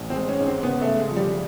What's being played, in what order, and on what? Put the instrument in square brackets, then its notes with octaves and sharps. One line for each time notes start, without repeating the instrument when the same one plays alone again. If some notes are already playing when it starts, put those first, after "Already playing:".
Already playing: [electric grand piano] A1
[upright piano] C4
[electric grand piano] G#3
[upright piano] C#4
[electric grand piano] G#2
[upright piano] C4
[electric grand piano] C#3 [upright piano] B3
[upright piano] A3
[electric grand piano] C#3
[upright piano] G#3
[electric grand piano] F3
[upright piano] G3